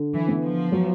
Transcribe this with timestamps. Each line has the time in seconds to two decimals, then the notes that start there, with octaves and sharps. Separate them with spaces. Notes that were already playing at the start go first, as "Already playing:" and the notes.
Already playing: D3
0.14 E3
0.28 B3
0.43 F3
0.72 F#3